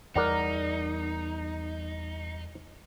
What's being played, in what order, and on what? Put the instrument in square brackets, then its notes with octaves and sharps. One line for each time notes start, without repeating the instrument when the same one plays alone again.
[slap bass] E2 G3 [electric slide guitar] D#4 [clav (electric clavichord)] A#4 D5 F#5